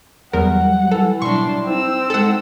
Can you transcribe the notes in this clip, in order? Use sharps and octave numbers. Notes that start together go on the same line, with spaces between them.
E2 F#3 G3 A#4 F#5
E3 A4
B2 F#3 G3 D4 E4 C6 C#6
C4 D#4 E6
G#3 G#4 A4 F#5